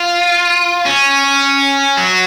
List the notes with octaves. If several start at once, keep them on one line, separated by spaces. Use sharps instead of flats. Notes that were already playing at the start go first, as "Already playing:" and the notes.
Already playing: F4
C#4
F#3